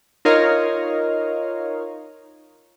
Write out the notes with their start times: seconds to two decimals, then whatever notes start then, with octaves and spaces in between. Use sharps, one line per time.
0.25 D#4 F4 A#4 C#5 D#5 F5